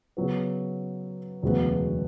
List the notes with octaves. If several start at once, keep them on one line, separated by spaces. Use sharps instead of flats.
C#3 F#3 B3
E1 D2 C#3 F#3 B3